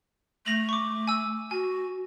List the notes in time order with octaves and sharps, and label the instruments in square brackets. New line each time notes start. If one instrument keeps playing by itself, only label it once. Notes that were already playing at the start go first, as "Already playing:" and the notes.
[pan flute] A3 [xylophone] A#6 F7 F#7
[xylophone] C#6 D6
G#5 E6
[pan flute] F#4 [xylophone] G#5